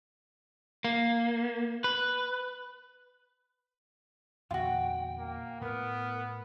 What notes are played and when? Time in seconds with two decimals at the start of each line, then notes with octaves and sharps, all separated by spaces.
0.84 A#3
1.84 B4
4.51 E2 A#2 D3 F4 F#4 G5
5.18 A#3
5.61 A2 A3 B3 A#4